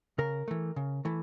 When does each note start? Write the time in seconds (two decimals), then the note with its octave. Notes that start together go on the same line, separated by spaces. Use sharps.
0.18 C#3 A#4
0.48 E3 A3
0.76 C#3
1.05 E3 A3